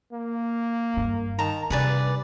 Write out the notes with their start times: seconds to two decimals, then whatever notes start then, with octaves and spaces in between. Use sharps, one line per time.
0.12 A#3
0.97 G2
1.39 D#3 A5 A#5
1.70 G2 C3 G#4 B4 D5